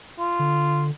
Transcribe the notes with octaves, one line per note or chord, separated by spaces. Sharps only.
F4
D3